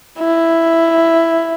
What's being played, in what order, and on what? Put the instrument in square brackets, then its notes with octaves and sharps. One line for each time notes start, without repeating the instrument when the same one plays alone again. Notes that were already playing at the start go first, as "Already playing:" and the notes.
[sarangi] E4